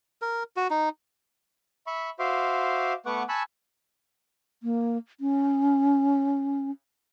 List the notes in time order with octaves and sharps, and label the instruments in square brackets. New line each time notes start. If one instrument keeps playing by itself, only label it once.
[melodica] A#4
F#4
D#4
[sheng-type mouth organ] E5 B5 C#6
F#4 C5 E5 F5 C6 D6
A3 B3 B4 F#5 C#6 D6
G#5 A5 B5 C#6 E6 F#6
[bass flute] A#3
C#4